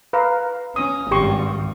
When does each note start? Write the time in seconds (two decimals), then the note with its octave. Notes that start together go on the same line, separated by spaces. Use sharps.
0.13 B4 F5 A#5
0.76 C#4 D#6
1.11 G#1 G2 G4 C6 C#6